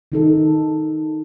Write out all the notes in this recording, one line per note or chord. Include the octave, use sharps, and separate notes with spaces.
D#3 D#4 A4